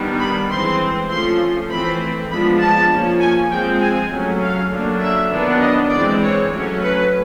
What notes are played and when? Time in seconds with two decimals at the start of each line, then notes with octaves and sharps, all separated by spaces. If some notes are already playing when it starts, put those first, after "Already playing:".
Already playing: D#3 G3 B3 D4
0.20 B5
0.50 E3 G#3 C4 C6
1.09 F3 A3 C#4 C6
1.70 E3 A3 C4 B5
2.30 F3 G#3 B3 D4 B5
2.60 A5
2.91 F3 A#3 C#4
3.20 G#5
3.50 F3 G#3 C4 G5
3.81 G#5
4.11 F#3 A3 C#4
4.41 F5
4.71 D3 F#3 A#3 D4
5.01 E5
5.31 D#3 F#3 B3 D4
5.61 D#5
5.91 E3 G#3 C4 D5
6.21 C#5
6.52 F#3 A3 C#4
6.82 B4